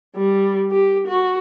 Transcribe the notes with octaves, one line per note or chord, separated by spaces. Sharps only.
G3
G4
F#4